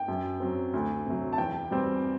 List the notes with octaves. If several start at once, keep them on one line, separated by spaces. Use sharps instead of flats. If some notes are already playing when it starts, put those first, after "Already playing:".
Already playing: G5
F#2
F#3 C4
D2
C3 F#3
A5
E2 G5
B2 G3 C4